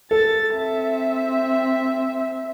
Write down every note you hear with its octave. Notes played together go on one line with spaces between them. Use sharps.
A4 A6
C4 E5